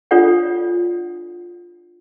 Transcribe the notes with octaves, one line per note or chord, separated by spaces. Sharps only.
D4 F4 A4 C#5 D5 F#5